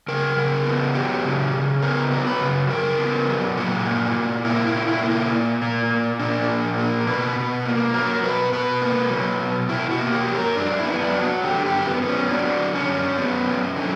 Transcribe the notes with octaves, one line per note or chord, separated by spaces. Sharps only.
C#3 A#4
C#3
B3
F#3 G4
C#3
C#3
B3 A#4
F#3
B4
C#3
C#3 A#4
B3
F#3
A#2 F#4
A#3
A#2
A#3 E4
E4
A#2
E4
A#3
E4
A#2
A#3
A#2
A#3 D4
A#2
A#3
B2 B4
B2
A#3
F#3 A#4
B2 B4
B2 B4
A#3
F#3
B2
B2 E4
F#4
A#3
G4
F#3
A#4
F#2 D4
E4
B3
E4
D4
F#3
F#4
D3 G4
G4
F#2
B3
B3
C#4
F#3 D4
D3
C#4
F#2
B3
F#3
D3